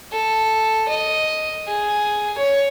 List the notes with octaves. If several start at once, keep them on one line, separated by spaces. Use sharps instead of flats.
A4
D#5
G#4
C#5